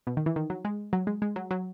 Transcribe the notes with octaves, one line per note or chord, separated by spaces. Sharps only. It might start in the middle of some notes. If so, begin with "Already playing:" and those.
B2
D#3
E3
D#3
F#3
G#3
F#3
G#3
G#3
F#3
F#3